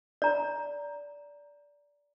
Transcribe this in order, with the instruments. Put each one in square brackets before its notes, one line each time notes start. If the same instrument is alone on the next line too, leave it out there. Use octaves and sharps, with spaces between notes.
[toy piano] D5 A#5